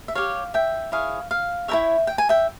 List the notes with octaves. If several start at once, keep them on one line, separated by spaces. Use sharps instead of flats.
E5
G4 C#5 F5
E5 G5
E4 G#4 C#5 F5
F5
E4 A#4 C#5 E5 G5
G5
G#5
E5 G5